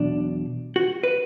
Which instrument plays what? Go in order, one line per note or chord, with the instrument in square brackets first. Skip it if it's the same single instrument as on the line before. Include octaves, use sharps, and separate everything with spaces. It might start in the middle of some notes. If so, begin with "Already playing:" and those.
Already playing: [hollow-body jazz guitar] E2 B2 F#3 D4
F#4
B4